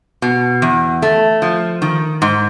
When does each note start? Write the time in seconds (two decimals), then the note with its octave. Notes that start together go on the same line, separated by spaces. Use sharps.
0.22 B2
0.62 E2
1.02 A3
1.42 F3
1.82 D#3
2.22 G#2